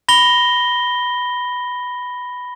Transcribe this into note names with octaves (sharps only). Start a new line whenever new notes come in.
B5 A#6 G7